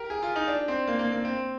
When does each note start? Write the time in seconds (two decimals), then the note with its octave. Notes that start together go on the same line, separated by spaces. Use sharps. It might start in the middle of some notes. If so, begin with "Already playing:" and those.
Already playing: G4 A#4
0.10 G#4
0.22 F4
0.36 D#4
0.48 D4
0.68 C4
0.87 A#3
0.99 A#3
1.12 A#3
1.25 C4